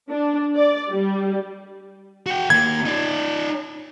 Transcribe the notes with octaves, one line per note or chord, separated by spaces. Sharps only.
D4
D5
G3
F#4 G5
D#2 A#3 G#6
D#4 D5